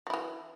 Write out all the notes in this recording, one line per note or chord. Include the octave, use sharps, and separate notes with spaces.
E3 F#3 E4